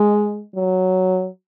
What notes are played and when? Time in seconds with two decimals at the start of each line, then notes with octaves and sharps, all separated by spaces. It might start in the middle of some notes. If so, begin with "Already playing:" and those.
Already playing: G#3
0.55 F#3